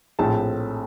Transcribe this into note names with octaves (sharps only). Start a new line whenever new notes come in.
A#1 A2 F3 A3 C4 A5